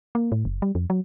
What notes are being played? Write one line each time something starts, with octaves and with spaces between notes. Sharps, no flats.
A#3
A2
F#1
G3
F2
F#3